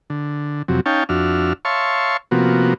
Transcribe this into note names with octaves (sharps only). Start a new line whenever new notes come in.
D3
F2 C3 F#3
C#4 D#4 C#5 F5 G5 A5
F2 D4 F#4 E5 F6
C#5 E5 F5 A5 C6 C#6
C3 F3 A#3 B3 F#4